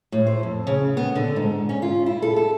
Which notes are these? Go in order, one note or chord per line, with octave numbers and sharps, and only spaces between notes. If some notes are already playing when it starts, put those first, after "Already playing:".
A2
C5
F2
C#3
B3
D3
G#2
C#4
F4
E4
A4
A4